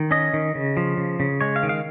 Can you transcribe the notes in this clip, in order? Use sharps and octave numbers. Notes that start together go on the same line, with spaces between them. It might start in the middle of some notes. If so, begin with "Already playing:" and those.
Already playing: D#3
C#4 D#5
D#3
C#3
F3
C#3
C#3
G#3 C#5
F5
D#3
F5